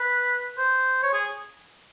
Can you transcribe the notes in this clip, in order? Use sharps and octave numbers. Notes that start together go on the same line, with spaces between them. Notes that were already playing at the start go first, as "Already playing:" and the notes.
Already playing: B4
C5
C#5
G#4